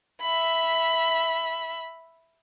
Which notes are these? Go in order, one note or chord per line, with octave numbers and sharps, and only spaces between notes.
E5 B5